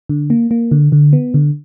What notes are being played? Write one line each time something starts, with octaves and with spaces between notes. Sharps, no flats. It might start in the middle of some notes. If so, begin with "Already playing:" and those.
D3
A#3
A#3
D3
D3
B3
D3